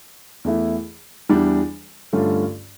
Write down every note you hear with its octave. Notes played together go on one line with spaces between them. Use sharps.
E2 E3 A3 E4
E2 E3 G3 D4
G2 D3 A3 C#4 F4